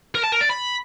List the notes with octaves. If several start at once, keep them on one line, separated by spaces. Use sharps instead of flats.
A#4
A5
A#4
D5
B5